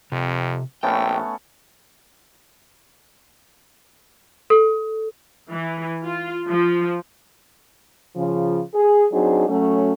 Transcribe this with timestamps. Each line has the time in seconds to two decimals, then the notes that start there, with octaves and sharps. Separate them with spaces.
0.12 F2 C3
0.83 A#1 A3 B3 C#4 G5
4.50 A4
5.50 E3
6.04 F4
6.49 F3
8.16 C#3 F3
8.74 G#4
9.12 F#3 C4 D4 D#4 F#4 G#4
9.48 F#3 A3 C#4